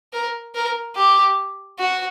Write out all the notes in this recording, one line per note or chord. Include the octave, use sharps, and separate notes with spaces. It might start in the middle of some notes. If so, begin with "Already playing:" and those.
A#4
A#4
G4
F#4